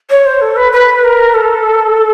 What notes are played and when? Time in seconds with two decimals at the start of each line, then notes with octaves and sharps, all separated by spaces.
0.10 C#5
0.26 C5
0.41 A4
0.56 B4
0.72 B4
1.04 A#4
1.34 A4